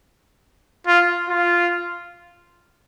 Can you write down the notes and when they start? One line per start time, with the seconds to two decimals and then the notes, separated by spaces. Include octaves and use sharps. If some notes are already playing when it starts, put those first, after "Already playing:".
0.87 F4
1.29 F4